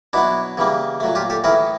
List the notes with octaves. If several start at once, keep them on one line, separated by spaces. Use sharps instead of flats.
B2 F#3 B3 D4 E4
C#3 E3 G3 A#3
A#2 F#3 A3
F4 G4
G4 A4
A2 E3 A3 G#4 A#4